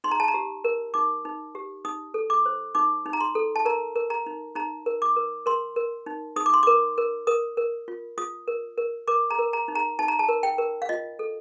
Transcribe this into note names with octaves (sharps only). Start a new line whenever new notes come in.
D#4 C6
A#5
A5
A#5
G4
A#4
D#4 D6
D#4
G4
D#4 D#6
A4
D6
C5
D#4 D6
D#4
A#5
C6
A4
A5
A#4 A#5
A#4
A#5
D#4
D#4 A#5
A#4
D6
A#4
A#4 C6
A#4
D#4
D#4 D#6
D6
C6
A#4 D6
A#4
A#4 D#6
A#4
F4
F4 D#6
A#4
A#4
A#4 D6
A#5
A#4
A#5
D#4
A#5
D#4 A5
A#5
A5
A#4
G5
A#4
F5
F4 D#5
A4